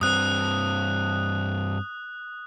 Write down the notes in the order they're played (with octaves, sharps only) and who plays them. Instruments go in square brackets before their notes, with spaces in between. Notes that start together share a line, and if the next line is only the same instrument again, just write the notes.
[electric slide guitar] G2 C4 [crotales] D#6 F#6